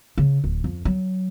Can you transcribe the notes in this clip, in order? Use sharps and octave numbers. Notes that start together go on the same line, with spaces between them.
C#3
D1
F2
F#3